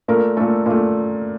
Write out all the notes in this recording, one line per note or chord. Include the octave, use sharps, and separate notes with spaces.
A#2 A3 A#4
A#2 A3 A4
A#2 A3